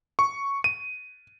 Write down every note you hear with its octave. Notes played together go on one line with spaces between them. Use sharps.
C#6
D#7